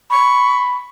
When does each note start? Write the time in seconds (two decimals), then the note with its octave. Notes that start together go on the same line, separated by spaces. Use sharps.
0.11 B5 C#6